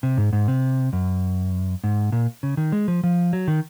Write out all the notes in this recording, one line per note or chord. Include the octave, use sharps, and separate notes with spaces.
C3
G#2
G#2
C3
F#2
G#2
A#2
C#3
D#3
G#3
F3
F3
F#3
D#3